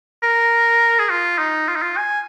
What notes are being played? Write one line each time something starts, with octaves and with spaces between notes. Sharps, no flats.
A#4
G#4
F4
D#4
F4
D#4
F4
G#5